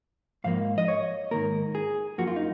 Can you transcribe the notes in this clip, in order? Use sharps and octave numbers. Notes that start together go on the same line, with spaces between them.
G#2 F3 A#3 F5
D#5
C#5
G#2 D#3 A#3 A#4
G#4
F#2 F3 A#3 F#4
F4
D#4